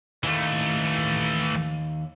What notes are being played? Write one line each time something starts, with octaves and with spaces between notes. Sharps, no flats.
D#2 E3 A3